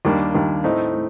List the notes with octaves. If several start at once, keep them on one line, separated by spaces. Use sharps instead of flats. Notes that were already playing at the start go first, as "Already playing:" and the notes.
D#2 D#3 G3 A#3 D4
D#2 D#3 G3 A#3 D4
A2 A3 C4 D#4
A2